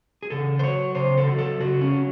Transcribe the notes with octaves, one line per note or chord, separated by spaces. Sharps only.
G#4
C#3 A4
C5
F#3 C#5
C#3 C5
A4
F#3
A4
C#3 F#4
C#4
F#3